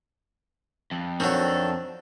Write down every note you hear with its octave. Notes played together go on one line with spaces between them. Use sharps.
F2
D#3 F#3 C4 D4 A4